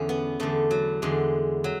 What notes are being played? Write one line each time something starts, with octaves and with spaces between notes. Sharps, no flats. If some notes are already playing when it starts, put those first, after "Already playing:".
Already playing: E2 D3 C#4
B3
E2 D3 A3
F#3
E2 D3 G#3
F#3